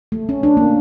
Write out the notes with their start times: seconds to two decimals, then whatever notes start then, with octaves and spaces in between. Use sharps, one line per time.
0.12 A3
0.29 C#4
0.43 D4
0.57 A#3